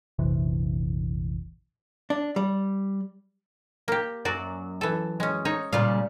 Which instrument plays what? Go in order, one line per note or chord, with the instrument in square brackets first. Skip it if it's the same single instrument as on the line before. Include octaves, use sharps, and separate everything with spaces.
[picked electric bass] F1 A#1 C3 E3
[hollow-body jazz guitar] D4
G3
[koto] A#3 G4
[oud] F#2 [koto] F#4 D5
[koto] E3 A4
G#3 C#4
D#4 C#5
[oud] A#2 C#3 G3 [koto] F4 F5